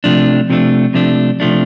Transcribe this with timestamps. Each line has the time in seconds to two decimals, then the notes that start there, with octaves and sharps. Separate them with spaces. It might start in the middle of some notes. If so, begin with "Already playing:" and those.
0.04 C3 F3 A3 D4
0.50 C3 F3 A3 D4
0.94 C3 F3 A3 D4
1.40 C3 F3 A3 D4